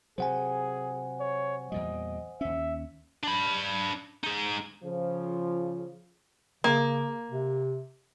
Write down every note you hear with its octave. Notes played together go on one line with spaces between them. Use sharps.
C3 F#3 G#4 C5 F#5 G#5
C#5
E2 A#2 G3 D#5
D#2 C#4 E5
D4 B5
D#4 G#4
C#3 F3
C#3 A#3
C3